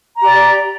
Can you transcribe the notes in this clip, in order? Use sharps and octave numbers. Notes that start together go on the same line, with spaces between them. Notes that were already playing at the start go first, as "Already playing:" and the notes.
G4 D5 A#5